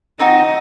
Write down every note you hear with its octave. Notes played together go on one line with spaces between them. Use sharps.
C4 D#4 F#4 D#5